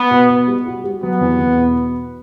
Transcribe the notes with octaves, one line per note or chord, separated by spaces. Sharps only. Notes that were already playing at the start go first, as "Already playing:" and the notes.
Already playing: B3
B2
B2
G3
F#4
G3
F#3 B3
E2
E2
B2